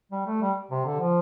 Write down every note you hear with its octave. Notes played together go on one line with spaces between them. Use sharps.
G3
A3
G3
C3
D3
F3